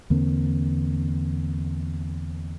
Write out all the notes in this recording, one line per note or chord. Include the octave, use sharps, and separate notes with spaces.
E2 D3 A#3 C4